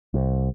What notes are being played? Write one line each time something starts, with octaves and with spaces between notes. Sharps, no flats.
C2